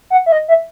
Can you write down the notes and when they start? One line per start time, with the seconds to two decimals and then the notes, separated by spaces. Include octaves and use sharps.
0.10 F#5
0.26 E5
0.32 D#5
0.48 E5